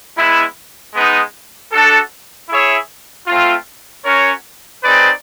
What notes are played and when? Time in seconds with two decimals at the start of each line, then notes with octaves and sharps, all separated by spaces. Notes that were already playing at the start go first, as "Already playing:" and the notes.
0.16 G#3 B3 E4
0.94 G#3 B3 D#4
1.71 D4 F#4 A4
2.49 E4 G#4 C#5 E5
3.27 A3 C4 F4
4.04 C#4 F#4 A#4 C#5
4.83 C4 D#4 G#4 B4 D5